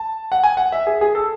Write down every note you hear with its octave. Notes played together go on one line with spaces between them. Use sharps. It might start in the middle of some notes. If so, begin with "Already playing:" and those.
Already playing: A5
F#5
G#5
F#5
E5
G#4
G#4
A4